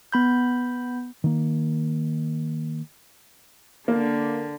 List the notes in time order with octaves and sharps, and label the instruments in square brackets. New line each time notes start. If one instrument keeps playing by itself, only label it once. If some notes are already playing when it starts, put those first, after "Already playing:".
[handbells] B3 B5 G6
[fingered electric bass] D#3 A#3
[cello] D3 [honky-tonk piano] A#3